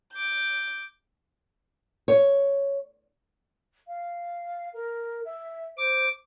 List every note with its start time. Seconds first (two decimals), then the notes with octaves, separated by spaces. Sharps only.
0.13 D6 G6
2.08 C#5
3.87 F5
4.74 A#4
5.25 E5
5.77 C5 D6